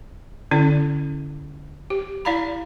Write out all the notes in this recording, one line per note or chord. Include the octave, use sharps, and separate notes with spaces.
D3 C#4 E4 D5
G4
E4 D5 F5 A#5 B5